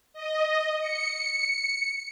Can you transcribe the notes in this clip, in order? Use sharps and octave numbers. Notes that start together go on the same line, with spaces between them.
D#5
C#7